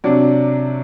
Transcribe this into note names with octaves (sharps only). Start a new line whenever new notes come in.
C3 F#3 D4